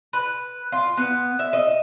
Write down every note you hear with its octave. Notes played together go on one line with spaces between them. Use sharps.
B4
F4
B3
E5
D#5